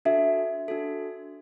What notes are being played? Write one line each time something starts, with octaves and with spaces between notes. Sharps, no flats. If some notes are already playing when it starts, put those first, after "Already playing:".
D4 F#4 A4 E5
D4 F#4 A4